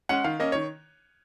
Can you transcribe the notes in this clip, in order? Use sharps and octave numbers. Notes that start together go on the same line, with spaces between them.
G#3 C#4 F#5
D#3 F5
A#3 C#4 D#5
D#3 C#5